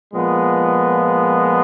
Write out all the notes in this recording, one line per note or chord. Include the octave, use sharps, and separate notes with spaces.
A#2 F3 G#3 B3